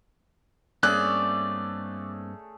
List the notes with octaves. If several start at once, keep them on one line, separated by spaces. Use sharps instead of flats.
G2 A3 A#3 C4 C#4 G#4 D5 F#6